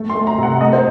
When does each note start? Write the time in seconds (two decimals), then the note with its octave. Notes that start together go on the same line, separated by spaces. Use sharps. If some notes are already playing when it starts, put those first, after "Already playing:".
Already playing: A3
0.10 C6
0.15 A3
0.27 A#5
0.38 C3 F#5
0.61 A3 D#5
0.73 C5